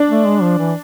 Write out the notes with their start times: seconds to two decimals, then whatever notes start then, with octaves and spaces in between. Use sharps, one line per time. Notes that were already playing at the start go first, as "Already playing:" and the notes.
Already playing: D4
0.09 A3
0.26 G#3
0.42 F3
0.58 E3